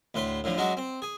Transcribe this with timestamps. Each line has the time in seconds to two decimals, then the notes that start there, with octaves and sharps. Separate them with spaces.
0.14 D2 A2 B4 C6
0.44 A2 D3 F3
0.57 F#3 G#3 C#4 E4 F#4
0.77 C4
1.02 G#4